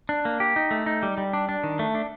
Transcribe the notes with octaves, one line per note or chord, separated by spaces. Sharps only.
D4
A#3
G4
D#4
A3
D#4
G3
G3
D4
D4
D#3
A3
D4